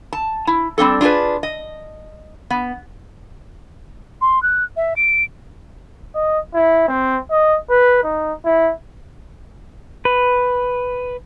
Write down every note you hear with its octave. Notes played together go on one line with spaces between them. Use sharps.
A5
E4
G3 C4 D4 A4
D4 F4 G4 G#4 B4
D#5
B3
C6
F#6
E5
D7
D#5
E4
C4
D#5
B4
D#4
E4
B4